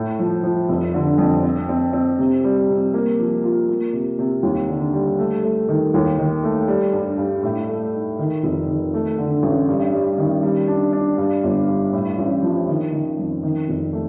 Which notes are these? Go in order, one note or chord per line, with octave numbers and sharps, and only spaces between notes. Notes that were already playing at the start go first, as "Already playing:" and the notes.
Already playing: A2
F3
F3
F1
D3
F2
C4
C4
C4
C3
G3
C3
A#3
F3
F4
A#3
C3
C3
D#2
D3
G3
A3
A3
D#3
D#2
D#3
A3
G3
G2
G2
A2
A3
D#4
D#3
F1
D#3
A3
D3
A1
G2
G3
D#3
G3
D4
D4
G2
G1
G2
A2
A1
F3
D#3
D#3
F2
D#3
F1
A3